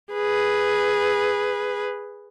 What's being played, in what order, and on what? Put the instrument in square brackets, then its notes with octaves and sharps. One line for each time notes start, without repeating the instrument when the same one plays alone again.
[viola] G#4 B4